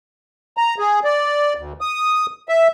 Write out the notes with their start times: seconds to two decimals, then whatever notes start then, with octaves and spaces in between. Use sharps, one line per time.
0.57 A#5
0.79 G#4
1.04 D5
1.56 D2
1.81 D#6
2.49 E5